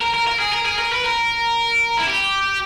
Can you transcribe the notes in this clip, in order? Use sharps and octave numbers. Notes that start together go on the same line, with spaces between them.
A#4
A#4
A#4
G#4
A#4
G#4
A#4
B4
A#4
E4
G4